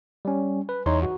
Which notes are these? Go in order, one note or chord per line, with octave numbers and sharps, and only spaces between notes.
G3 C#4
B4
E2 D#4 C#5 C6
F#4